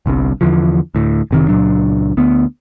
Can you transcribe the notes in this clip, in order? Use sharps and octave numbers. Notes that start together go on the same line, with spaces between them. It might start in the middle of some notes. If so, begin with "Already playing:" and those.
G1 C2 G2 C3
E2 D3 E3 F3
D2 A2
F#1 C3 D#3
C#2 A#2 F#3 D4
D2 B3